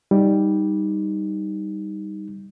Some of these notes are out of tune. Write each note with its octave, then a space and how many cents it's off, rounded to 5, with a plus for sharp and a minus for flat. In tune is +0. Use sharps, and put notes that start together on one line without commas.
G3 +0 D#4 +0